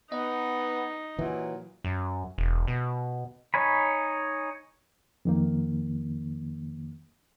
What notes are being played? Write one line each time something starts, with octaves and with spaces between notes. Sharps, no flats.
B3 D#4 D#5
A#2 E3 F#3
F#2
E1
B2
D#4 C#5 G#5 B5
F2 D#3 A#3